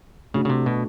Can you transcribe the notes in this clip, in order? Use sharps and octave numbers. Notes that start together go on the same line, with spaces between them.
C#3 A3 D4 F#4
C#3
C3
B2